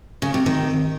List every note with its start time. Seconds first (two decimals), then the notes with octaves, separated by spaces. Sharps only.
0.22 C#3
0.34 C3
0.46 D#3